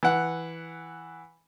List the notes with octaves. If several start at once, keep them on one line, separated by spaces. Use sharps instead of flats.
E3 F#5